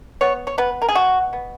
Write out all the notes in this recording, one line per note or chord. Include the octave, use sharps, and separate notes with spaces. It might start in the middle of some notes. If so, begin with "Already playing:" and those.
B3 C#5
C#5
B3 B4
A#4
G#4
B2 F#4
B3